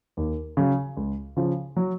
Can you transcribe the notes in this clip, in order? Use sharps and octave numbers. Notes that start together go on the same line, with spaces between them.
D#2
C#3 F#3
C#2
C#3 F3
F#3